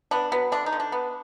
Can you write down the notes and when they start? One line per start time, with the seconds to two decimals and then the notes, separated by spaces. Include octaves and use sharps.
0.11 B3 D4
0.32 F#3 B3
0.52 D3 D4
0.66 D#4
0.73 D3
0.80 D4
0.92 B3